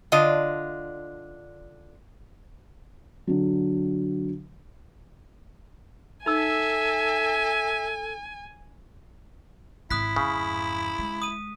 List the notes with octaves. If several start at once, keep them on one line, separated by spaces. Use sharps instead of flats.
D3 D4 F4 D#5
D3 F#3
D#4 A4 E5 G#5 E6
G#1 C4 E4 D#6 F#6 B6
F2 G#2 C#3
G#3
D#6 D#7